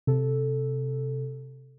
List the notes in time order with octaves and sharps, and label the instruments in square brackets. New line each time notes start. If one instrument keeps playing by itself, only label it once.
[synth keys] C3 A4